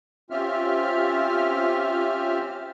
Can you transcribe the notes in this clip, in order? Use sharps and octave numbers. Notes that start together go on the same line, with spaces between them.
C4 C#4 F4 G4 E5 F6